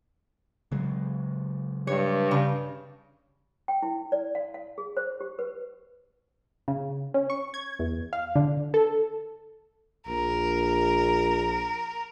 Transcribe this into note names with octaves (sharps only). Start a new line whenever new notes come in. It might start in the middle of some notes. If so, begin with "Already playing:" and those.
C#3 F#3 G#3
G2 C#5
C#3
G5
E4
D5
F5
F5
G#4
C5
G4
B4
C#3
C#4
C#6
G#6
E2
F5
D3
A4
A#1 A#4